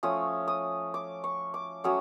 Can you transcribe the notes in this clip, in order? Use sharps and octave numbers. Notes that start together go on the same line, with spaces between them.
F3 A3 C#4 D#6
D#6
D6
C#6
D6
F#3 A3 C#4 D#6